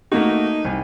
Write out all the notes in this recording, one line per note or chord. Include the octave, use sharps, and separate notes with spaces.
A3 A#3 D#4 F#4
C2 G#5